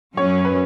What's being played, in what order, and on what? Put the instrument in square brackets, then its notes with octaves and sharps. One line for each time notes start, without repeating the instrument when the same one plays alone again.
[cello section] F#2 F#3 C#4 [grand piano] C#5
[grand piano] B4